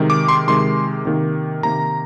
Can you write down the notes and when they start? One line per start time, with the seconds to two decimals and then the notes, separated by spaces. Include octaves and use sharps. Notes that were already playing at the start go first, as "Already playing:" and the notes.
Already playing: C3 D#3 G#3
0.10 D6
0.28 C6
0.48 C3 D#3 G#3 C6
1.05 C3 D#3 A#3
1.63 C3 D#3 A#3 A#5